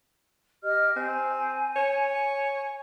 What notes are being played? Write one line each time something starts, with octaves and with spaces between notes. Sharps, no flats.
G4 D#5 F6
C4 G#5
C#5